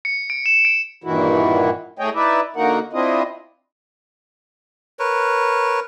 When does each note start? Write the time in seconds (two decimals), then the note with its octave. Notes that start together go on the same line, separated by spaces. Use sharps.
0.05 C#7
0.30 D7
0.46 E7
0.65 D7
1.04 G2 A#2 D#3 E3 E4 F#4
1.99 A2 A3 G#4 C#5 D#5 G5
2.15 D#4 E4 B4 D5 E5
2.56 D3 A#3 D#4 F#4 A#4 F#5
2.93 C4 D4 E4 F4 D#5
4.99 A#4 B4 C#5